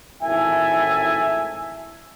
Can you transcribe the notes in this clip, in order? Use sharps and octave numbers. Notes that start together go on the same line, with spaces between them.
G#1 A2 E4 E5 G#5 A5